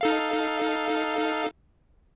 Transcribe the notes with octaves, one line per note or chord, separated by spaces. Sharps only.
D#4 A4 F5